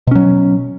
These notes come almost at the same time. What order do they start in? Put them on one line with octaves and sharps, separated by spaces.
B2 C#4 F#3